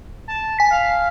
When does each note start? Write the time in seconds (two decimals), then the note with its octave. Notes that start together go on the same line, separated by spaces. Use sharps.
0.28 A5
0.59 G#5 B6
0.70 F5